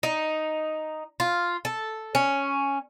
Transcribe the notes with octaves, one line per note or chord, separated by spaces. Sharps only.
D#4
F4
A4
C#4